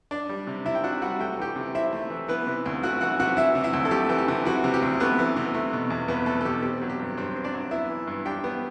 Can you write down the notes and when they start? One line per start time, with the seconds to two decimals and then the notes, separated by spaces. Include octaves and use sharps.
0.11 D4 D5
0.29 G3
0.47 C3
0.65 C3 E4 E5
0.75 G5
0.83 D4 F#4 F#5
1.02 G3 F#4 F#5
1.20 A3 G5
1.38 E3 G4 G5
1.56 C3
1.75 C4 E4 E5
1.93 A3
2.10 E3
2.28 E3 B3 B4
2.47 C3
2.66 D2
2.83 A3 F#4 F#5
3.01 E3 F#4 F#5
3.20 C3 F#4 F#5
3.37 E3 E4 E5
3.55 C3
3.64 E4 E5
3.73 D2
3.85 A4
3.91 A3 G4
4.09 E3
4.18 G4
4.28 C3
4.45 E3 F#4
4.64 C3
4.74 G4
4.82 D2
5.00 A3 B3 B4
5.19 E3
5.36 C3
5.55 A3
5.73 B2
5.90 E2
6.08 E2 B3 B4
6.26 A3 A4
6.41 A4
6.45 B2 G4
6.62 C4 G4
6.82 F#3
6.90 G4
7.00 G2
7.17 G2 C4 C5
7.35 C4
7.44 D4 D5
7.54 F#3
7.71 B3 E4 E5
7.89 E3
8.07 G2
8.25 D4 G4 G5
8.44 B3